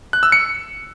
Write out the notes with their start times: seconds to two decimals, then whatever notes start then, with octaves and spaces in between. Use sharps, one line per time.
0.13 F#6
0.23 E6
0.32 C#7